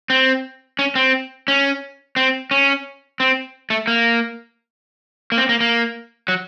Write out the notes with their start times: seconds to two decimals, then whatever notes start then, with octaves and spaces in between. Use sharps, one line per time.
0.10 C4
0.79 C#4
0.95 C4
1.48 C#4
2.16 C4
2.51 C#4
3.20 C4
3.70 A3
3.87 A#3
5.32 A#3
5.38 C4
5.49 A#3
5.60 A#3
6.28 F#3